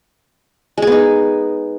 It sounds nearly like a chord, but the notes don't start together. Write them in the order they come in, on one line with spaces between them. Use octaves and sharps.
G#3 G#4 B3 D#4